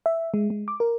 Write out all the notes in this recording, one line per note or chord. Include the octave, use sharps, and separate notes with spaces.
E5
G#3
G#3
D6
A#4